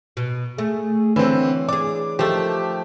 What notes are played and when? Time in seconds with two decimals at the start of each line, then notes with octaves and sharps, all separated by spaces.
0.17 B2
0.58 A3 G#4
1.16 D3 E3 C4 C#5
1.69 D4 G#4 D6
2.19 D#3 F3 A3 G4